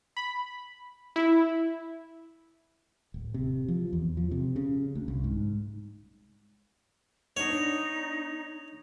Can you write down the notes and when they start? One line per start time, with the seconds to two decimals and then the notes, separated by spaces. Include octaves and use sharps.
0.17 B5
1.16 E4
3.14 D1
3.34 C3
3.68 F3
3.93 E2
4.17 F3
4.31 C3
4.56 C#3
4.95 D2
5.08 C2
5.24 G#2
7.37 B3 D4 D#4 C#5